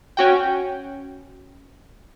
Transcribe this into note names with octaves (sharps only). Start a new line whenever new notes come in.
C#4 F#4 G5